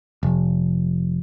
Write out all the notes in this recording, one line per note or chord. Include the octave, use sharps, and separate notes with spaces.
F1